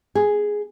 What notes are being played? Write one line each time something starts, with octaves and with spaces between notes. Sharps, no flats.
G#4